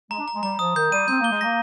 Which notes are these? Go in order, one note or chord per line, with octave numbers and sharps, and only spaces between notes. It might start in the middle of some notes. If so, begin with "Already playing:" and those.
G#3 A#5
D4
A#5
G#3
G3 A#5
F3 D#6
D#3 G6
G3 D#7
C4 G6
A#3 G7
G#3
A#3 A#6